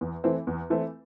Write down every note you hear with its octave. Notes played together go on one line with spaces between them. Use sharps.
E2
E3 A3 C4
E2
E3 A3 C4